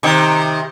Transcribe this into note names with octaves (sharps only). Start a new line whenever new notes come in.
C3 D#3